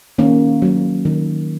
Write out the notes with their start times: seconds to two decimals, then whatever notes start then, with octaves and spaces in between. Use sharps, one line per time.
0.18 D#3 A#3 C#4
0.62 F#3 A#3
1.05 D#3